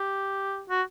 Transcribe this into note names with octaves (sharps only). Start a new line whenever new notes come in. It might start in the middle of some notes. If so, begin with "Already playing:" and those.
Already playing: G4
F#4